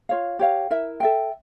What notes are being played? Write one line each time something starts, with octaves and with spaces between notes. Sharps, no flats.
F4 C#5 F5
G4 C#5 F5
E4 A#4 E5
A4 E5 G5